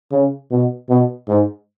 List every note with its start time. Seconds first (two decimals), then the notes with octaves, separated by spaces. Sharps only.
0.12 C#3
0.51 B2
0.89 B2
1.28 G#2